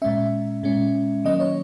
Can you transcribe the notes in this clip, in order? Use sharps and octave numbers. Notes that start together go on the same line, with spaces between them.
A#2 G#3 C#4 E5
A#2 G#3 C#4
D#3 F#3 A#3 C#4 D#5
C#5